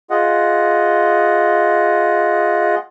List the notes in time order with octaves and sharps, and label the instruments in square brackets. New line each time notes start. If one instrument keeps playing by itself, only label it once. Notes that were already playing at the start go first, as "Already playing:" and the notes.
[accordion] F4 G#4 D#5 F#5